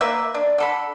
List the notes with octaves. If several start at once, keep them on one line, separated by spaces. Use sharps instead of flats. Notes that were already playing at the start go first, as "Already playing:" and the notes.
A#3 B4 E5
D4
D3 A4 B5